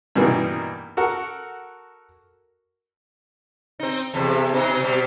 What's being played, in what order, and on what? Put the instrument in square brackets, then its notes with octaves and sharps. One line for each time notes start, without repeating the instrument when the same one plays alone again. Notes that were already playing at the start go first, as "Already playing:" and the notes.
[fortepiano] G2 B2 E3 A#3 B3 D#4
F#4 A4 A#4 F#5
[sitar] C4 D#4
E2 C3
B2 D#4
B2 G3